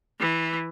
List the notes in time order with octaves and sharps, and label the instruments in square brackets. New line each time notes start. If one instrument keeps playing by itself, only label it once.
[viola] E3